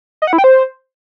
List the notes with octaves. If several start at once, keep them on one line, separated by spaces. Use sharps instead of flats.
D#5
F#5
E4
G5
C5